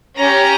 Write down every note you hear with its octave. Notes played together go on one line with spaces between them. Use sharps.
C#4 G4 A#5